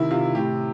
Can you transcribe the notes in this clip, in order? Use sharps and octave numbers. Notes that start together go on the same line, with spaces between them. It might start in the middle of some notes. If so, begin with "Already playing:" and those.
Already playing: C3 D#3 E4
C3 F4
A2 G4